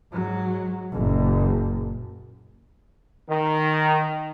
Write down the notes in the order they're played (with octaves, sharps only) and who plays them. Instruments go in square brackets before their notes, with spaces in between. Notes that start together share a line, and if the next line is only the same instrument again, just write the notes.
[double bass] G#2 F#3
F#1 A#2
[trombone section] D#3